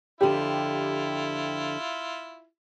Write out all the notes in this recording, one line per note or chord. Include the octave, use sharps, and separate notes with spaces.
F2 D3 E4 F4 G4